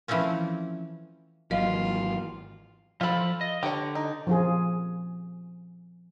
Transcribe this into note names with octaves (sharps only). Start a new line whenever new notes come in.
E3 F3 A3 C4 C#4
G#1 E3 F#3 A#3 F4 D#5 F5
F3 F4 A4 B5
D#5
D3 G4 C#5
D#4
F3 F4 G#4